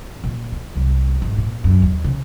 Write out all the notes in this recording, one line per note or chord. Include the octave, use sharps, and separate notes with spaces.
A#2
D#3
C2
G#1
A#2
F#2
D#2
C#3